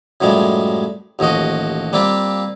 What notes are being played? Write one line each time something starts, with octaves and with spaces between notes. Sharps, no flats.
F#2 A2 F3 G3 G#3
A1 D#2 F3 F#4 D#5
G3 A#3 C4 F4 G4